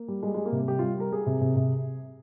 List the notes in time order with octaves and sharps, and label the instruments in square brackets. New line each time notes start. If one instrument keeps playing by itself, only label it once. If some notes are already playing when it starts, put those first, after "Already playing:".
Already playing: [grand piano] A#3
G3
G3 G#3
G3 G#3
A#3
C3
G3 G4
G3 F4
G3 A#4
G3 G#4
C3
C3
C3